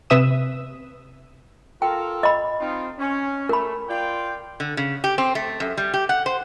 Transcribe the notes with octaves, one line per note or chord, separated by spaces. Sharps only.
C3 B4 E5 D#6 E7
F4 A4 A#4 G5
D#5 B5
C4 D#4 F4
C#4
A3 A#4 B5
F4 D5 G5
D3
C#3
G4
C4
A3
F#2
G3
G4
F#5
C5